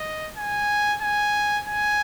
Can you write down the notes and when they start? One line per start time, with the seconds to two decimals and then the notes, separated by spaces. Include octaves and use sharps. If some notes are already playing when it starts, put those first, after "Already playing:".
Already playing: D#5
0.37 G#5
1.01 G#5
1.67 G#5